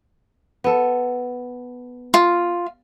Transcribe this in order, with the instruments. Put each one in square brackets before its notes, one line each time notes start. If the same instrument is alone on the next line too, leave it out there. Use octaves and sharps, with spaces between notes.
[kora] B3 A4
[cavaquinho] F4